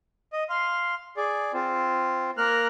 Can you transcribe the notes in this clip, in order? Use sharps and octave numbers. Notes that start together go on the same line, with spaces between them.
D#5
F5 C6
G#4 D5
C4 F4
A#3 A#4 F6 F#6